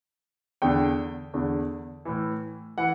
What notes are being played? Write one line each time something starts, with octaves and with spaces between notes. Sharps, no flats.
E2 D3 G5
E2 D3
A2 E3
E3 F#5